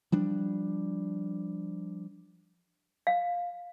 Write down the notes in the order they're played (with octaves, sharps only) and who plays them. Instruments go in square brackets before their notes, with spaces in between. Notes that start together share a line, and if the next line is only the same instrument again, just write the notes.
[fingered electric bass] F3 G3 D4
[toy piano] F5